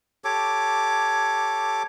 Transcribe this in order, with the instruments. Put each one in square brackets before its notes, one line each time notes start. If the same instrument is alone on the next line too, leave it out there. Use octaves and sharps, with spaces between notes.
[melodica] G4 A4 C#5 D6